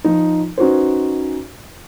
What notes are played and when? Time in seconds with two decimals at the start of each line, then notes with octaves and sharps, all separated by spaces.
0.04 F3 D#4
0.58 C#4 D#4 F#4 B4 C5